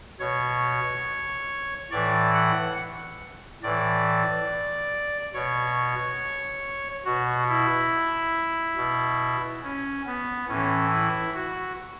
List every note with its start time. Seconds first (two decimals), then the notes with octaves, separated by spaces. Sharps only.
0.20 B2 C#5
1.91 A2 E3 D5
2.35 F#5
3.63 A2 E3 D5
5.34 B2 C#5
7.05 B2 F#4
7.49 E4
8.77 B2
9.63 C#4
10.06 B3
10.48 A2 E3 C#4
10.91 E4
11.34 F#4